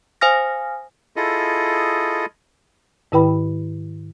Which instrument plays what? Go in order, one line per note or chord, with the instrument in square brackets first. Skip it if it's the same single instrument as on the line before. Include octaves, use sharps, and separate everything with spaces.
[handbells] C5 F5 G#5 D#6 F6 A#6
[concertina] E4 F4 G#4 A4 D#5
[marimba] G#2 D#3 E4 B4 G5 B5